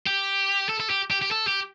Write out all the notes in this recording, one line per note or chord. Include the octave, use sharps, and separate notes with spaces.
G4
A4
A4
G4
G4
G4
A4
G4